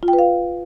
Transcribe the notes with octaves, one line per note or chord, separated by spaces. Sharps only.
F4
G5
B4
F5